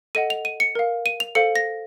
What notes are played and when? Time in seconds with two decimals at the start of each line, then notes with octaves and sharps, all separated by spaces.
0.15 A4 D#5 F#5 D#7
0.30 F7
0.45 D#7
0.60 C#7
0.75 A#4 F5
1.06 D#7
1.20 F7
1.35 A4 C5 F5 C#7
1.56 A#6